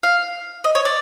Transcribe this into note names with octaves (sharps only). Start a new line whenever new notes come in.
F5
D#5
C#5
D5